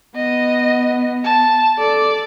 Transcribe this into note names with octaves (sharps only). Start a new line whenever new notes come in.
B3 D#5
A5
A4 D5